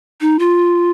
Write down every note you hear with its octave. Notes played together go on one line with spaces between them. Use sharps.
D#4
F4